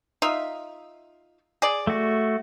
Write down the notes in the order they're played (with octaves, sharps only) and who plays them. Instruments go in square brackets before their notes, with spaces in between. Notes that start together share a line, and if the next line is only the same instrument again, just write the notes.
[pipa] D#4 F4 E5
G#4 D5
[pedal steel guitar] A3 F#4